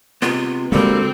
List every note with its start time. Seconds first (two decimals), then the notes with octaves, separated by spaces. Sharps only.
0.22 C3 G#3 B3 F4
0.72 D3 G3 G#3 A#3 C4 F#4 A4